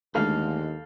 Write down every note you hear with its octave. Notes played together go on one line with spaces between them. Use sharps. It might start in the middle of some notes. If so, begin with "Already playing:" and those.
D#2 D3 G#3 A3 A4 F5